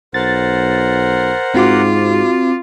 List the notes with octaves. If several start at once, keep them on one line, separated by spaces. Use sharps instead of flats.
B1 A#4 C5 F#5 A6
G#2 C4 F4 F#4 D6